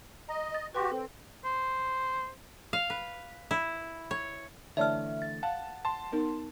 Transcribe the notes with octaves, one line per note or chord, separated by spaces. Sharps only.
D#5 A#5
A6
F#4 G4 B4 G5 C6
C4 A4
C5
F5
B4
E4
C#5
D3 E3 A3 C#5 D5 E5 A5 F6
A6
F5 F#5 A5
A5 C6
B3 D#4 A#4